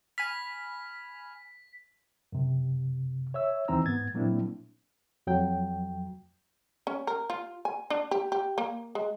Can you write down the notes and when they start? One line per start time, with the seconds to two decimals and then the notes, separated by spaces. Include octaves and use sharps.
0.18 G#5 B5 F6 B6
2.32 F#2 C3
3.34 C#5 E5 E6
3.68 D#2 E3 C4 D#4 A#5 E6
3.85 G#2 B3 G#6 A6
4.14 A#2 F#3 A#3 C4 D4 E4
5.27 F2 F#3 G5
6.87 C#4
7.07 A#4
7.30 F4
7.65 G#5
7.90 D4
8.11 G4
8.32 G4
8.58 A#3
8.95 G#3